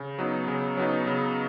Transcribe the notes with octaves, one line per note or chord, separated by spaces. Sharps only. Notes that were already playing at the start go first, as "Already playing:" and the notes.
Already playing: C#3
F#3 B3 D#4
C#3
F#3 B3 D#4
C#3